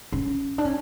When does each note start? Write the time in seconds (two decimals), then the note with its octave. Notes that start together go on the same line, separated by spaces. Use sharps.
0.12 C#4
0.58 D4
0.65 C#4